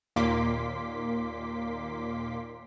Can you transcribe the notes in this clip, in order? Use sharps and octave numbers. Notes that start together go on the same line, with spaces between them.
D#2 A#2 A#3 C6 D6 B6